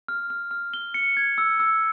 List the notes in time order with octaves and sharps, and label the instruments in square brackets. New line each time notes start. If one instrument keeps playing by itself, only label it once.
[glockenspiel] F6
F6
F6
G7
C#7
G#6
E6
E6